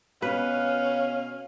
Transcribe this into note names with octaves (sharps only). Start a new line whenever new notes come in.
B2 C#4 B4 F5